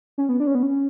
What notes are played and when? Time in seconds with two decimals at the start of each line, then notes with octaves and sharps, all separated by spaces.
0.18 C#4
0.29 B3
0.40 D4
0.47 C#4
0.55 B3
0.63 C#4